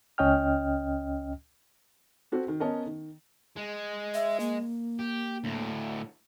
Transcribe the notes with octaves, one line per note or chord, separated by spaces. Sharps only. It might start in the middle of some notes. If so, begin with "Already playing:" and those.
C#2 C#4 D#5 G5 F6
C4 F#4 A4
D#3
B3 C#4 A#4 C#5 D#5 A5
D#3
G#3
E5
A#3
G4
D2 A2